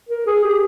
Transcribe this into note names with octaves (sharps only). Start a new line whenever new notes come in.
A#4
G#4
G4